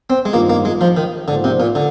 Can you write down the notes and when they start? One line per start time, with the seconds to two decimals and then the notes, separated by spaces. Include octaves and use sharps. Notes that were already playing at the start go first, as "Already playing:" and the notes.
0.10 C4
0.25 G#3
0.33 G2 D#3 G3 A#3 C4 F4
0.50 A#3
0.65 G#3
0.81 F3
0.97 D#3
1.28 G#2 D3 F3 A#3 F4 C5
1.44 C3
1.60 A#2
1.75 D3